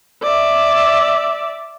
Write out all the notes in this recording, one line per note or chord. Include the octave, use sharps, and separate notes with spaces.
D5 E5